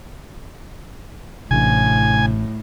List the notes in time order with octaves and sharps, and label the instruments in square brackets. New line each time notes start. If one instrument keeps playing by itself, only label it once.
[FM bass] A1 [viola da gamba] A2 [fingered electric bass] C3 D4 [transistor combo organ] G#5